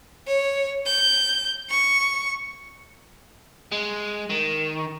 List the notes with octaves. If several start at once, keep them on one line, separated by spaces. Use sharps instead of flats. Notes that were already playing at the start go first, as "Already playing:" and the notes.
C#5
G6
C#6
G#3
D#3